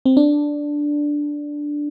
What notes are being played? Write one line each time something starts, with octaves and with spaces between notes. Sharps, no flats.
C4
D4